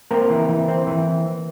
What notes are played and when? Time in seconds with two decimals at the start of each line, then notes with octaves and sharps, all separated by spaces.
0.11 A#3 C4 A#4
0.30 E3
0.49 E3
0.68 C4
0.87 E3